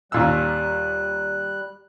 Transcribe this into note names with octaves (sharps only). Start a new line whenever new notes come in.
D#2 A#2 G3 E6 F#6